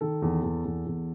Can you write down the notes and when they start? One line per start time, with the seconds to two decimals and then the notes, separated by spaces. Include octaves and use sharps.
0.01 D#3 A4
0.22 E2
0.43 E2
0.65 E2
0.86 E2